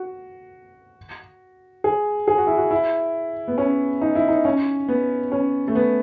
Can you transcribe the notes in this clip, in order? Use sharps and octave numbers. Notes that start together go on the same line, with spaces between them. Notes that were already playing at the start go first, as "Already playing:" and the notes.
Already playing: F#4
G#4
G#4
F#4
E4
F#4
E4
B3
C#4
D#4
E4
D#4
C#4
B3
C#4
A3
B3